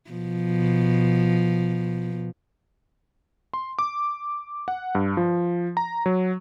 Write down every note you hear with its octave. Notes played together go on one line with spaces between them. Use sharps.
B2 F3
C6
D6
F#5
G2
F3
A#5
F#3